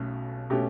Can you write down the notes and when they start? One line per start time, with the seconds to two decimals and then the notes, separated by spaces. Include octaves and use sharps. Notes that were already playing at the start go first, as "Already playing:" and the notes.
Already playing: B1 B2 A3 C#4
0.50 B2 A3 C#4 G4